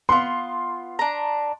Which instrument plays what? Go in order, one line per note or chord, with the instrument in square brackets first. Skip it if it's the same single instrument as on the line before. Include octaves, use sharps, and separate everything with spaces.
[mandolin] B3 F4 [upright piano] C6
[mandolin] D4 A#5